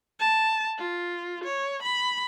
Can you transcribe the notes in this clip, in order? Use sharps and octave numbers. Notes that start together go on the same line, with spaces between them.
A5
F4
C#5
B5